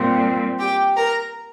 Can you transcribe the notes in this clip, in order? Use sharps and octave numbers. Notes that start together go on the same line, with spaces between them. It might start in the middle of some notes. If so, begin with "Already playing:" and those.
Already playing: A#2 G3 C4
G4 G5
A#4 A#5